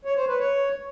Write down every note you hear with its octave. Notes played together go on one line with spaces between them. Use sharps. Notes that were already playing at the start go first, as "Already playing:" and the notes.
C#5
C5
B4
C#5